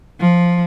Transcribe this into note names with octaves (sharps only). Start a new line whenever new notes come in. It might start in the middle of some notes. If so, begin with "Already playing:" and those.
F3